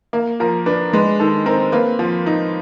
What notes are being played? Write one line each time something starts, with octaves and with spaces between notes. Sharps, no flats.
A#3
F3 A#4
D4 B4
G#3 B4
D#3 A4
C4 A#4
A#3 B4
F3
D#4